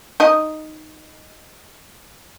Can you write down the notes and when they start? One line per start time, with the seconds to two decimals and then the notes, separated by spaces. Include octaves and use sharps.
0.20 D#4 D#5